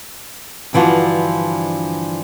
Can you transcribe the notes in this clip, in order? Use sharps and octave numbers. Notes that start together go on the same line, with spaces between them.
G2 D3 E3 F3 F4 F#4